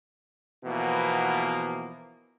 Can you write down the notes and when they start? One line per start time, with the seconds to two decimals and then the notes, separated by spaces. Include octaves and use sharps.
0.65 B2 E3 F3 A#3 B3